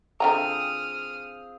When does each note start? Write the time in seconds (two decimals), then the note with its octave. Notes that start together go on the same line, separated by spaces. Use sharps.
0.20 D3 C4 F4 G#4 G5 A#5 D#6 F6